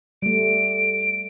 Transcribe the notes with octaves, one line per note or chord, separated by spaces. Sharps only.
G3 A3 D7